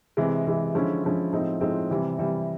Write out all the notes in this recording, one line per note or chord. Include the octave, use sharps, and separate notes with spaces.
C3 E3 G#3
C3 E3 G#3
D3 F3 G#3 C#4 E4
D3 F3 G#3 C#4 E4
A2 F3 G#3 C4 D#4
A2 F3 G#3 C4 D#4
C3 E3 G3
C3 E3 G3